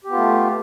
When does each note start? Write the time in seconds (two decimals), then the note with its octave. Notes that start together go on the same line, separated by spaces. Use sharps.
0.04 G4
0.08 B3
0.13 F4
0.17 A3